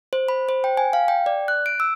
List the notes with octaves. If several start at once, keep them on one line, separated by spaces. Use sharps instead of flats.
C5
B5
C5
G5
G#5
F5
G5
D5
F#6
D7
E6